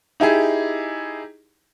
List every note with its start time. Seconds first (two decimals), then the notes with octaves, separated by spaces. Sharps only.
0.20 D#4 E4 G4 G#4